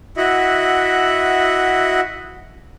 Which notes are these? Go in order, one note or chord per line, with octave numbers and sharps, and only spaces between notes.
E4 F#4 D#5 E5 F#5